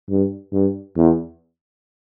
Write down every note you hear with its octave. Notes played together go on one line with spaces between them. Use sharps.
G2
G2
E2